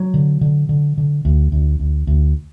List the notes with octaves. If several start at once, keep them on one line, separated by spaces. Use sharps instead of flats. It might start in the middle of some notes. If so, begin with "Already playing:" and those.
Already playing: F#3
D3
D3
D3
D3
D2
D2
D2
D2